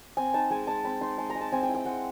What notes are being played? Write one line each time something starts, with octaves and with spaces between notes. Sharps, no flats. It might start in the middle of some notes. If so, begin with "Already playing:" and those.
C4 G#5
D#4 A5
G#3 G#5
G#3 A5
C4 B5
D#4 C6
G#3 C6
A#5
G#3
A5
C4 G#5
G5
E4
G5
G#3 F#5